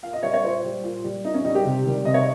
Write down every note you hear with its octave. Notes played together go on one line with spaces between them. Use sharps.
A#2 F5
D#5
G3 C#5
C#5
A#2 C5
G3
A#2
G3
A#2 D#4
C#4
G3 D#4
G4
C3
D#3 G3
C3 D#5
C#5